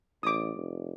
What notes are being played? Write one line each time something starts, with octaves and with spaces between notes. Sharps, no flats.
A1 D6 D#6
F1